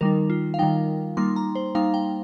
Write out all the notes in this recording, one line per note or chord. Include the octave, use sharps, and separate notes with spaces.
D#3 G3 D#4 A#4
F4
F5
D#3 G3 D#4 G5
G3 A#3 D#4 C6
A#5
C5
G3 A#3 D#4 F5
G5